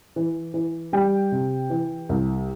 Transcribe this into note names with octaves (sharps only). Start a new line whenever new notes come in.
E3
E3
G3 G4 G5
C3
E3
C2